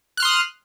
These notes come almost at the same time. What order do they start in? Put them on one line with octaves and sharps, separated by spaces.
F#6 F6 C6 D#6